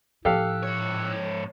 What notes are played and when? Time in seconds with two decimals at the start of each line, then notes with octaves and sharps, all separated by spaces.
0.25 A2 F3 G4 A4 F5 E6 F#6
0.63 G#2 C#5